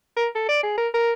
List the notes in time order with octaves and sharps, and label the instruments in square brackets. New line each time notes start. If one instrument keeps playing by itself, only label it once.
[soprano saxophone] A#4
A4
D5
G#4
A#4
A#4